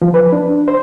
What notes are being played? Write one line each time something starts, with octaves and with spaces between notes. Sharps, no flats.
F3
B4
D4
C5